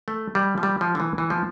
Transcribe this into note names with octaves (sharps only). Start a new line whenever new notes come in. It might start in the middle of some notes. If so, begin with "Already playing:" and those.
A3
G3
F3
G3
F3
D3
E3
E3
F3